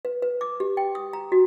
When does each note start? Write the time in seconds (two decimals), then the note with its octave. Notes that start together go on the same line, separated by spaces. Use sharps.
0.05 B4
0.22 B4
0.41 D6
0.60 G4
0.77 G5
0.95 D#6
1.13 A#5
1.32 F#4